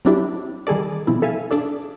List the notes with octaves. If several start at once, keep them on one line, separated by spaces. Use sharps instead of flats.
F#3 C4 D4 E4 G4
D#3 G3 G#4 A4 D5
B2 F3 C4 E4
A4 E5 F5 G#5
D4 G#4 A4 D5